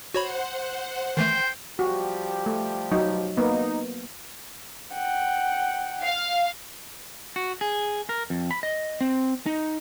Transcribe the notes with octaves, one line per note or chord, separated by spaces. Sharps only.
F#4 C5 C#5 F#5 B5
D#3 E3 A3 C5 G5
F3 G3 F#4 G4
A3
F#3 D#4
A#3 B3 D#4
F#5 G5
F5
F#4
G#4
A#4
F2
B5
D#5
C4
D#4